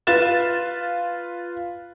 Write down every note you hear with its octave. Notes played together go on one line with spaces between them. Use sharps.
F4 B4 A6 E7